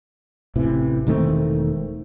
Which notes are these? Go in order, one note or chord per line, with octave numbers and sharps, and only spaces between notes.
A1 C3 E3
E1 D#3 A3 C4